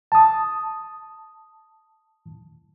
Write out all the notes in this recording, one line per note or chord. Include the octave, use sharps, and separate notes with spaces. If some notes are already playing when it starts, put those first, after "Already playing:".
A5 D#6